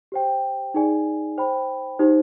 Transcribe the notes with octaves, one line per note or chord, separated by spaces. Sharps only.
G4 C5 G5
D#4 G#4 D5 G#5
C5 G5 B5
D#4 G4 C5